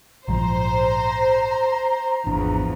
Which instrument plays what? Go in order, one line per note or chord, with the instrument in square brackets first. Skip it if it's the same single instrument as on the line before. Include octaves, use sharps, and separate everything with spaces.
[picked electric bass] A#1 G#2 F3 [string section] C5 [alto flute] A#5
[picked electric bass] G#1 D4 [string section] E2 F3